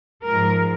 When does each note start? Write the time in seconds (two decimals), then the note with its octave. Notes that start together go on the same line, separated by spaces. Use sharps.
0.25 G#2 F3 G#3 A#4